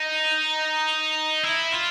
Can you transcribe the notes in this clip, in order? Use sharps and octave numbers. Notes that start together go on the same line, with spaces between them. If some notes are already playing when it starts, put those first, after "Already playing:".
Already playing: D#4
E4
F4